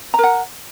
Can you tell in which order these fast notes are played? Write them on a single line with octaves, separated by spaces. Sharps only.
A#5 A#4 F#5